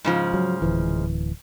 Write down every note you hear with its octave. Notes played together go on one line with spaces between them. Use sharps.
G#2 C#3 F3
F#3
D1 E3